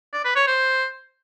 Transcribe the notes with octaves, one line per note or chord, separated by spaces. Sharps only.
D5
B4
C#5
C5